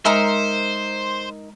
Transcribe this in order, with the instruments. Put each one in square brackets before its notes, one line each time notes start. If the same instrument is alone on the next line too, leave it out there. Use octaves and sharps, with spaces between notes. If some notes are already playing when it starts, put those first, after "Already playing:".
[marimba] G#3 [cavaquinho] D#4 A#4 E5 [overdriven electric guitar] C5